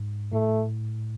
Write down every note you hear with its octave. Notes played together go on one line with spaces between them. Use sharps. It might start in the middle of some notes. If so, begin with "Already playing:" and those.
Already playing: G#2
A2 A3